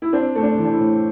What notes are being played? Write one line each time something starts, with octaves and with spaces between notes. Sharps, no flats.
E4
C4 D4
A3
D4
E3
D4
E4
A2